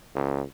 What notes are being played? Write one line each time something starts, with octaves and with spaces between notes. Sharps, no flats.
C#2